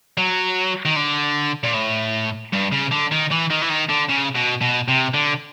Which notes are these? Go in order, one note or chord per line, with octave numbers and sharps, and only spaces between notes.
F#3
D#3
D3
A#2
A2
G2
C#3
D3
D#3
E3
D#3
E3
D#3
D3
C#3
B2
B2
C3
D3